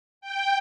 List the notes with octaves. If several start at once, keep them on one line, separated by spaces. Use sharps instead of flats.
G5